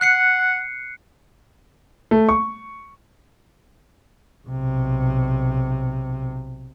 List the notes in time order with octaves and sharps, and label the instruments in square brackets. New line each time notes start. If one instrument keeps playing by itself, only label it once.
[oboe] F#5 [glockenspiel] F#6 C7 C#7
[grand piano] A3
C#6
[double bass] B1 C3